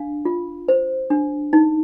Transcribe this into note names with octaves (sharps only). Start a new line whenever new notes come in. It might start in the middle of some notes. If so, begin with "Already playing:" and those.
Already playing: D4 F5
F4
C5
D4
D#4